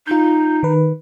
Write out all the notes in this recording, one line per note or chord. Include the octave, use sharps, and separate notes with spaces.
D#4 F4 G6
D#3 B4